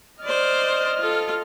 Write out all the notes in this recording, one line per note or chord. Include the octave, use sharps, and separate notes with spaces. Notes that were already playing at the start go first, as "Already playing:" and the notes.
C5 D5 D#5 F6
F4 A4